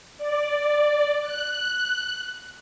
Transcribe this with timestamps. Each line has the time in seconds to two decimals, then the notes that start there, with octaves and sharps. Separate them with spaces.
0.18 D5
1.21 F#6